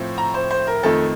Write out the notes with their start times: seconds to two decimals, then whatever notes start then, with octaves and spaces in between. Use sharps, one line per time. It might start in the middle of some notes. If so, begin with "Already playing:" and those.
Already playing: A2 F3 C4
0.18 A#5
0.34 C5
0.51 C5
0.67 A#4
0.83 F2 D#3 A3 A4